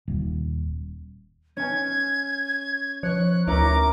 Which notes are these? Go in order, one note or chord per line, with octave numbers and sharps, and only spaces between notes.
D#1
C#4 G#5 G#6
F3 C#5 F#6
D2 C#4 E4 A#4 A#5 D6